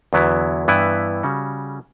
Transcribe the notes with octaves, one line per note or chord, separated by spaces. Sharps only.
E2 D3 F#3 B3 E4
G2 E3 B3 E4 B4
C#3 G3 C#4 F#4